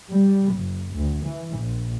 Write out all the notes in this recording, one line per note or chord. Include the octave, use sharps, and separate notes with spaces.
G3
F#1
D2
E3
A#1